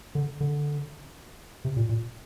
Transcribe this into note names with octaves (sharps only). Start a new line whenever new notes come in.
D3
D3
C3
A#2
A#2